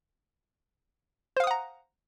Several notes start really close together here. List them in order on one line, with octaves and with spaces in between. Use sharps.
C5 F5 D#6 F#5 A#5